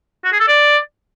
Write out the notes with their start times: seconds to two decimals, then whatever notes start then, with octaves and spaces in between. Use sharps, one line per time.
0.25 F#4
0.32 G#4
0.40 A4
0.48 D5